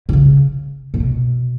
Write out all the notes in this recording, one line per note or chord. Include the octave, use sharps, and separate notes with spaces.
B2
C#3
A#2
B2